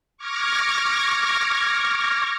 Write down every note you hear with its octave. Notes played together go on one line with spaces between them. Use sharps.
C#6 D6 F6 G#6 A#6